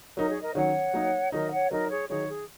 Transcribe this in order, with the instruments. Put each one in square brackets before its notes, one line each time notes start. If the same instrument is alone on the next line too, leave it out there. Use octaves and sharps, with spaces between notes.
[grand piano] F#3 D#4 [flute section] A#4
[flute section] G#4 C#5
A#4 D#5
[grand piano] D#3 F#3 C#4 [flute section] C#5 F#5
[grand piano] F#3 A#3 D#4
[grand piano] D#3 F#3 D#4 [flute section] A#4 D#5
[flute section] C#5 F#5
[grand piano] F#3 D#4 [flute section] A#4 D#5
[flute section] G#4 C#5
[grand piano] D#3 F#3 D#4 [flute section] G#4 C#5
[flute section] G#4